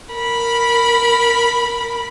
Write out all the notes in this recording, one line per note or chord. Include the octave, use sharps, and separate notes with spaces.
A#4 B5